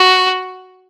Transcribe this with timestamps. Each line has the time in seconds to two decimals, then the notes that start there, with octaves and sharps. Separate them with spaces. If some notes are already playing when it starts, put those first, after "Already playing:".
Already playing: F#4